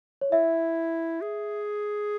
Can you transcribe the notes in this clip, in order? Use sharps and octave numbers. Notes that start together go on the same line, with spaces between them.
C#5
E4 E5
G#4